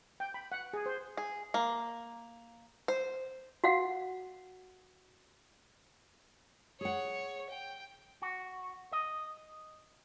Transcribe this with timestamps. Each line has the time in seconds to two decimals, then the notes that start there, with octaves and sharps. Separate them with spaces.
0.20 G5
0.34 B5
0.52 F#5
0.73 G#4
0.86 C5
1.17 G#4
1.54 A#3
2.88 C5
3.64 F#4 F5 F#5
6.81 G#4 C#5 F#5
7.50 G5
8.22 F#4
8.92 D#5